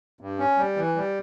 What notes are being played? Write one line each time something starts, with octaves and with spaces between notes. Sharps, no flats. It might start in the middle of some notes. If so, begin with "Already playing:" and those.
G2
C#4
G3
E3
G3